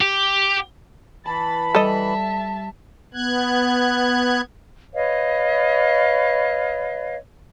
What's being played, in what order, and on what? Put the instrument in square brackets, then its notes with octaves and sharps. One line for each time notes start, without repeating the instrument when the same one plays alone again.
[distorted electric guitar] G4
[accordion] E3 B5 [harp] A5 [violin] A6
[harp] G3 [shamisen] A4 D#5 [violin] E5 A5
[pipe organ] B3 F#6 G#6
[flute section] B4 C#5 D#5 F5